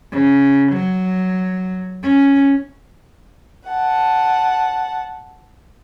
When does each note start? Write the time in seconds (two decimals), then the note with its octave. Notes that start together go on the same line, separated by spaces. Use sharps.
0.12 C#3
0.72 F#3
2.03 C#4
3.68 F#5 A5